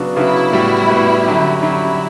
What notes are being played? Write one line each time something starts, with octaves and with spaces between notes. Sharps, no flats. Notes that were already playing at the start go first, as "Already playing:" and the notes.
Already playing: C#3 F#3 B3 D4 F#4
C#3 F#3 B3 D4 E4 F#4
A2 G3 B3 F#4
A2 G3 B3 F#4
D3 F#3 C#4 G4
D3 F#3 C#4 E4 G4